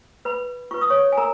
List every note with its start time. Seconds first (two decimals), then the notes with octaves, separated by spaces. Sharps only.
0.25 B4 B5
0.71 F4 B4 C#6
0.81 D#6
0.90 C#5 C#6
1.12 G#5
1.17 A#4 A#5